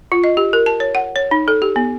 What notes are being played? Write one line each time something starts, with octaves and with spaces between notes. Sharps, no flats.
F4
D#5
G4
A#4
A5
C#5
F#5
C#5
D#4
A4
G4
B3